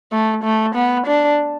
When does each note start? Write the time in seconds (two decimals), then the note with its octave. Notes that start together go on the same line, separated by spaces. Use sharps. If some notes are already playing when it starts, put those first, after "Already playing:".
0.12 A3
0.43 A3
0.75 B3
1.07 D4